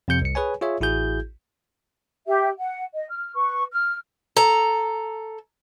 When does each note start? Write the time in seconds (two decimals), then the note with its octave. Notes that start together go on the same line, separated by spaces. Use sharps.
0.08 F2 C3 G6 C#7
0.22 C2 C#7
0.35 G#4 B4 C#5 G#5
0.61 F4 G#4 C#5 E5
0.81 A1 E4 F#4 G#4 G6
2.27 G4 E5
2.58 F#5
2.93 D#5
3.09 F6
3.35 B4 C#6
3.72 F6
4.36 A4 A#5